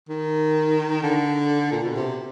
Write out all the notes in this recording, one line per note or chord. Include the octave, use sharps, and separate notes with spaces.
D#3
D3
A#2
B2
C3